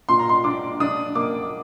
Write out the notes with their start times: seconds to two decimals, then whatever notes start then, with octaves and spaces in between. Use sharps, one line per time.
0.09 A#2 C6
0.19 A#5
0.29 C6
0.44 D4 D6
0.80 D4 D#6
1.15 A#3 D6